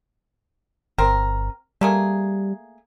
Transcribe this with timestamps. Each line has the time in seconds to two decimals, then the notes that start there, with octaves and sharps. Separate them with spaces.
0.98 G1 C4 A#4
1.81 G3 A3 A#3 G#4